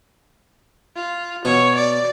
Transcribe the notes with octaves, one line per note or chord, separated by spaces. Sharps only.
F4
B2 C#5
D5